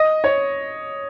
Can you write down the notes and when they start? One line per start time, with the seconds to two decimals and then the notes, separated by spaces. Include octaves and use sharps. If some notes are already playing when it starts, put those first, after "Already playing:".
Already playing: D#5
0.24 C#5